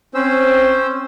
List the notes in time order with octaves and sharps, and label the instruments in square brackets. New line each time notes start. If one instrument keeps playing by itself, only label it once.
[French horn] C4 [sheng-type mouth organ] C#4 C5 E6